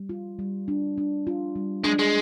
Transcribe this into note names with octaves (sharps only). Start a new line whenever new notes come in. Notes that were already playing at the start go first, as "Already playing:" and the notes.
Already playing: G3
F4
G3
D4
D4
F4
G3
G#3 D4
G#3